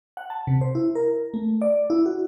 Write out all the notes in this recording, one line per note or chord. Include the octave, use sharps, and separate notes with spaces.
F#5
A5
C3
C5
E4
A#4
A3
D5
E4
F#4